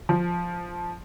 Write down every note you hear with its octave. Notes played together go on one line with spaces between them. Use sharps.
F3